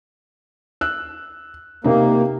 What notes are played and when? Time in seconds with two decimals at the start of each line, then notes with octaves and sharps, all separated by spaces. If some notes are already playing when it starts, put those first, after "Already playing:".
0.81 E6 F#6
1.84 C3 A#3 D#4